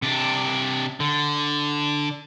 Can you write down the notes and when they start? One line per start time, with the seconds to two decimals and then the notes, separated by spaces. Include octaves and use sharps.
0.02 C3 D4
1.00 D3